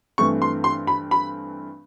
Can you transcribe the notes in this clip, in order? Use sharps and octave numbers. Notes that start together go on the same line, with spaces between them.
G2 E3 A3 C4 C#6
C6
C6
B5
B5